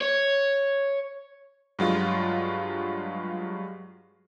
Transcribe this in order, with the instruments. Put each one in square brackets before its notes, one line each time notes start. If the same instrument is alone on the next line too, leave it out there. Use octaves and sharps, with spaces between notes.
[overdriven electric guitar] C#5
[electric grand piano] G2 F#3 G#3 F4